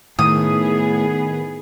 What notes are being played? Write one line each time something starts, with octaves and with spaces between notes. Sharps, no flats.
A2 D#3 B3 G#4 D#6